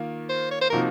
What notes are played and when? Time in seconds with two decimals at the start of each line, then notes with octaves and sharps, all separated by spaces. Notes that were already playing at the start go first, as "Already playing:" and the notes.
Already playing: D#3 A#3 F4
0.29 C5
0.51 C#5
0.61 C5
0.70 C3 F3 A#3 D#4 F#4 A#4